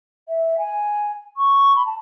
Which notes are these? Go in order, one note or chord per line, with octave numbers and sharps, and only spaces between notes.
E5
G#5
C#6
B5
A5